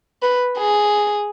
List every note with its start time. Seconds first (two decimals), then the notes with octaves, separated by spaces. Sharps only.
0.23 B4
0.58 G#4